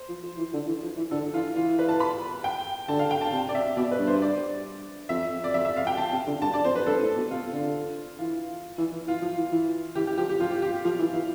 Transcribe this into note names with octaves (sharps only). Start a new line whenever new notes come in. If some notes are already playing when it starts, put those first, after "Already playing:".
Already playing: C5
F3
F3
E3
D3
E3
F3
E3
D3 A4
E3 F4
E3 F4
B4
A5
B5
G5
D3 A5
F5
G5
A5
C3
D5
E5
B2 D5
B4
G2
C5
D5
F2 E5
D5
F2 E5
E5
F5
G5
F2 A5
C3
D3
G2 A5
D5
F2 C5
B4
G2 A4
A2
B2
C3 F4
D3
E3 F4
E3
E3
E3 F4
F3
E3
E3
E3 G4
G4
F3 G4
G4
F3 F4
G4
G4
F3 F5
E3
E3